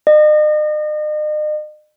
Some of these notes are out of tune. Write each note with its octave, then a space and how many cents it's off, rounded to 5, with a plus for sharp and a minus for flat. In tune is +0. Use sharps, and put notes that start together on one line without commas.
D#5 -40